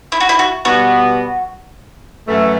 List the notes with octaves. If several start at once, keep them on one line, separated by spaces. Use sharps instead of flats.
E4
F#4
E4
F#4
B2 G3 B3 F#4
F#2 E3 A3